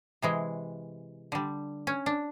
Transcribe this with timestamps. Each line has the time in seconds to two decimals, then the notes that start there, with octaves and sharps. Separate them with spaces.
0.22 C3 E3 G#3
1.32 D3 G3
1.87 C#4
2.06 D4